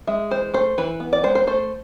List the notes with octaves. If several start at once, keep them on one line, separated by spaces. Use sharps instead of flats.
G#3 E5
E3 C5
A3 C5
E3 B4
B3
D5
G#3 C5
C5
A3 C5